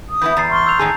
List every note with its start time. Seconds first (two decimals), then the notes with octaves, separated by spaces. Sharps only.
0.10 D#6
0.22 E3 B3 E4 G6
0.37 E2 A#5 A6 C7
0.50 C6 C#6 F6
0.66 E6 G6 F7
0.79 A2 D#3 G#4 A5 A#5